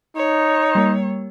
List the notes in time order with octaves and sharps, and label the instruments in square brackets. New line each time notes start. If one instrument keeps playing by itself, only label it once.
[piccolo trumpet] D#4 [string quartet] C#5
[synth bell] G3 A#3